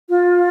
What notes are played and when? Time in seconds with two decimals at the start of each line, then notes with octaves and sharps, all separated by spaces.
0.09 F4